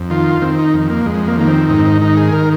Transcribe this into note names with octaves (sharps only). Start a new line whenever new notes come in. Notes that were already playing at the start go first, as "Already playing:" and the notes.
Already playing: F2
D#3 F4
D#3 C4
D#4
F2
A#3
F2 G#3
A#3
D#3 A#3
C4
G#2 D#4
C4
D#4
D#3 D#4
G#4
A#4